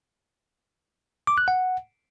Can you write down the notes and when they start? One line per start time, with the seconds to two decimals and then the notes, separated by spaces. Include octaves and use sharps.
1.27 D6
1.38 F#6
1.48 F#5